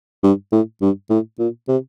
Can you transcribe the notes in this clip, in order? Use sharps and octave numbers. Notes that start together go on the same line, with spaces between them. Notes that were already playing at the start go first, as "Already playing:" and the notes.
G2
A2
G2
A2
A#2
C3